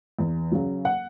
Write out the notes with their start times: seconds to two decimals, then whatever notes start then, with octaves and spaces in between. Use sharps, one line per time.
0.19 E2
0.52 C#3 F#3
0.85 F#5